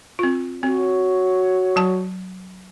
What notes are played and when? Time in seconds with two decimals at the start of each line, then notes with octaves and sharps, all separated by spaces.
0.19 C4 F4
0.63 C4 F#4 C#5
1.76 F#3 A5